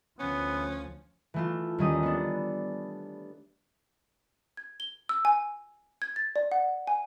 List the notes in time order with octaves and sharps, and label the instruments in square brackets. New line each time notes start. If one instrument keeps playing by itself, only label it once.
[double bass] D2 F3 [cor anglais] B3 [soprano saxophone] C#4
[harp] E3 A3 F4
D#2 G3 C#4 D#5 D#6
B3 D4
[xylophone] G#6
G7
E6
G#5
G#6
A6
D5
F#5
G#5